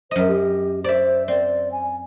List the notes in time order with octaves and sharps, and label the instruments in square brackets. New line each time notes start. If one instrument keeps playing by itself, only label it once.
[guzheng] F#2 D#5 [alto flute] C5
[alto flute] G4
[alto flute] C5 [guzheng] D5 E5
[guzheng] C4 [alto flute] D5
[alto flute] G#5